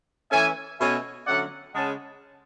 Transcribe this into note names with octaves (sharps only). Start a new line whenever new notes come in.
E3 A3 C#4 E5 G#5
B2 A3 C#4 E5 G#5
D3 F#3 A3 C#4 D5 F#5
C#3 G#3 C#4 F#5 A5